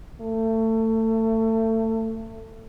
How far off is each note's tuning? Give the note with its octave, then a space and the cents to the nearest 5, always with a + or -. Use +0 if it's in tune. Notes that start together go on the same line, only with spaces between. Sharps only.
A3 +25